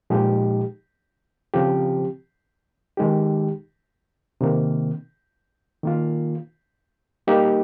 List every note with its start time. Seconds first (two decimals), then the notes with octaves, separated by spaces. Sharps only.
0.10 A#2 F3 G#3 D#4 G4
1.54 C#3 F3 C4 G4
2.97 D#3 G#3 D#4 G4
4.41 C3 D#3 A#3
5.83 D#3 A#3 F4
7.27 G3 A#3 D#4 G4